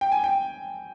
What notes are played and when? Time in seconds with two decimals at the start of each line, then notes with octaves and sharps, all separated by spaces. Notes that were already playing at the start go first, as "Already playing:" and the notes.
0.01 G5
0.12 G#5
0.24 G5